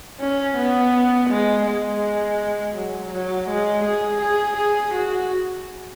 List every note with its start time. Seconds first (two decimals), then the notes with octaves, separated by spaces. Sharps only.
0.20 C#4
0.57 B3
1.30 G#3
1.67 G#3
2.75 F#3
3.12 F#3
3.49 G#3
3.85 G#4
4.21 G#4
4.57 G#4
4.94 F#4